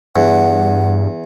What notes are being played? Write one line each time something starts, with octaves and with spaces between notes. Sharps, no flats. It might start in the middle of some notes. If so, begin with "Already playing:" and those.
E2 G2 F#5